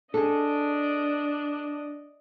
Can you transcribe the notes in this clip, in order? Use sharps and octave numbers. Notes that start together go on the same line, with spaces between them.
D4 G#4 A4 D5 D#5